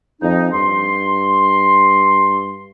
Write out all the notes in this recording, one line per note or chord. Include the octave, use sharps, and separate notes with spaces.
F2 D#4
G2 C6